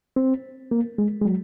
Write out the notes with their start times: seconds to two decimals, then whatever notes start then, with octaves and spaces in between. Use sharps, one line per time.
0.16 C4
0.71 A#3
0.98 G#3
1.21 G#3
1.25 F#3